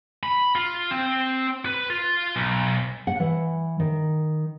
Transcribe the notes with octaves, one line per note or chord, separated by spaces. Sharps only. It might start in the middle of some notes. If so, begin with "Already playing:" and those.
B5
F4
C4
B4
F4
B1
F#5
E3
D#3